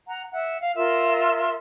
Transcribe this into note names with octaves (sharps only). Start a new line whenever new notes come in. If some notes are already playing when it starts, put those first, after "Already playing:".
F#5 A#5
E5 F#5
F5
F4 A#4 E5 C6